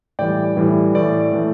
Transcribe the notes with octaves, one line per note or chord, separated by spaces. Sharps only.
A2 E3 G3 D5 G5
A2 E3 G3
A2 E3 A3 D5
A2 E3 A3